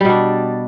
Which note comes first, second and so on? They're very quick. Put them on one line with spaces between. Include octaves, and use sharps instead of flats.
G3 B2 D4